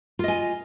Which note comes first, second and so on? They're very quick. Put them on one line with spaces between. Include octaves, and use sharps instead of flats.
F4 D#5 G#5